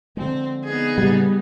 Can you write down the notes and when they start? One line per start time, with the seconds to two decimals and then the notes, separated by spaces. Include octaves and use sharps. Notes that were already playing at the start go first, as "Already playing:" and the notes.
0.17 D3 F3 G#3 C4
0.64 B3 D#4 G#4
0.98 A2 C#3 G3 A#3